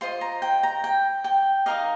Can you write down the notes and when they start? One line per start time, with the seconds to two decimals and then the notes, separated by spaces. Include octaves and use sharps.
0.01 F4 C5 D#5 C6
0.21 A#5
0.42 G5
0.63 A#5
0.84 G5
1.24 G5
1.66 D#4 A#4 D#5 F5